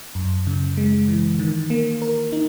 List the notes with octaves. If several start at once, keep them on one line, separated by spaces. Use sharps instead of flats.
F#2
C#3
G#3
E3
D#3
A#3
A#4
D#4